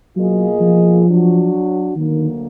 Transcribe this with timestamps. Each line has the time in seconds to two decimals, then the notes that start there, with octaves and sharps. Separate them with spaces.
0.15 B2 F#3 A#3 F4 G#4 D#5
0.61 F3
1.06 F#3 D4 F#4
1.96 D2 D3 D#3 F#3 A#3